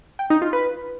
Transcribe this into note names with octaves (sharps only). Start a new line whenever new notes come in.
G5
D#4
F4
B4